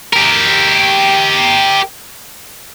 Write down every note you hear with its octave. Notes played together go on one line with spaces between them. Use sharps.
G4 A#4